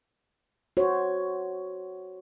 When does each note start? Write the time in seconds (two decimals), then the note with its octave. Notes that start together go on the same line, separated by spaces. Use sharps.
0.77 F#4 C5 C#5